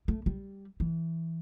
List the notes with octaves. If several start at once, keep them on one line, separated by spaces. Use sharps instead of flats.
A3
G3
E3